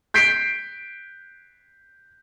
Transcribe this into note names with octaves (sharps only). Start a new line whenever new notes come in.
G6 B6 C7 D7